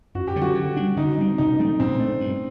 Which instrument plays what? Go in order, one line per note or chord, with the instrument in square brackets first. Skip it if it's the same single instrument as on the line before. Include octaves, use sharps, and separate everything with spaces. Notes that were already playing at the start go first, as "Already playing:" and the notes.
[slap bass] F#2 [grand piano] F#4
[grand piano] G4
[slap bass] D3 F#3
[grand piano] F#4
[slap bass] D3
G3 D4
[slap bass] D3 [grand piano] D#4
[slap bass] G3 C4
[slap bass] C3 [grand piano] D#4
[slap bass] F#3 A3 C4
[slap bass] A#2 [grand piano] C4
[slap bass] A3 D4
G2